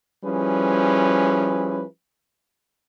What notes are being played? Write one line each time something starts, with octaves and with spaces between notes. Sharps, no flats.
F3 G3 C#4 E4 G#4 B4